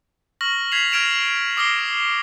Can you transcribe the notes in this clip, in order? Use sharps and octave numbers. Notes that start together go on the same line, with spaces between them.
C#6 F6 A#6 F#7
G#6 B6 C7 F7
F6 G#6 A#6 D7 E7 F7
D6 D#6 F6 A#6 C7 G7